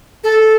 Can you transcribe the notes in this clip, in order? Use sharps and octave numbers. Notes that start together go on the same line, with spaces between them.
A4